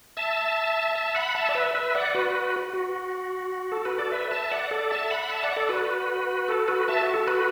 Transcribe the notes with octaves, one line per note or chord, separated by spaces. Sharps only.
E5 A5
E5 A5
F#5 B5
E5 A5
D5
B4 E5
B4 E5
D5 F#5
F#4 B4
F#4
A4
F#4 B4
A4 D5
B4 E5
E5 A5
D5 F#5
A4 D5
E5 A5
F#5 B5
E5 A5
D5 F#5
A4 D5
F#4 B4
A4
F#4 B4
E5 A5
F#4
A4
F#4 B4